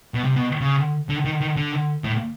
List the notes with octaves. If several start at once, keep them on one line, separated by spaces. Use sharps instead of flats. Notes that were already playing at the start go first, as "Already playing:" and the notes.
B2
C3
B2
C#3
D3
D#3
D#3
D3
A2